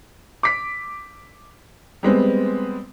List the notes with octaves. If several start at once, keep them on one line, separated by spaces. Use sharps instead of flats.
D6 B6
G3 G#3 B3 C4